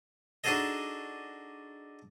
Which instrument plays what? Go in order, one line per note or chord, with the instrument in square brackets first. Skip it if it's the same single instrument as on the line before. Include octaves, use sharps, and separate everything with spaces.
[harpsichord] D4 D#4 F#4 G#4 A4 D#5